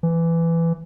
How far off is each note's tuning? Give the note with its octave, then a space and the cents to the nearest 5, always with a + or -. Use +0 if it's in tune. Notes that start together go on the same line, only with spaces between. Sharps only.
E3 +15